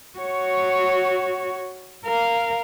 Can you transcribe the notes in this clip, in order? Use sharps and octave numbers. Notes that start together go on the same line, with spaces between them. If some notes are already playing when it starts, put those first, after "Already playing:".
F#4 C#5
A#4 F5